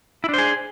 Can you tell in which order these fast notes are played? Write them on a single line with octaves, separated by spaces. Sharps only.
E4 D4 C5 G#4